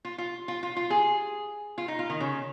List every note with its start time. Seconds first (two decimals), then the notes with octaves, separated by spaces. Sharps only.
0.05 F4
0.18 F4
0.48 F4
0.63 F4
0.77 F4
0.90 G#4
1.78 F4
1.88 D#4
1.99 F4
2.10 D#3
2.20 C#3